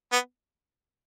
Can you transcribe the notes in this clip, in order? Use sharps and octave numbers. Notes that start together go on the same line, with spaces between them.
B3